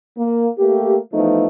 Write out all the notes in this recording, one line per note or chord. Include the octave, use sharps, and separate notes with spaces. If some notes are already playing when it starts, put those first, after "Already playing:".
A#3
A3 A#3 G4
E3 F3 A3 B3 D#4